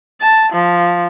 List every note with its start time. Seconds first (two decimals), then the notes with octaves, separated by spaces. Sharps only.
0.21 A5
0.53 F3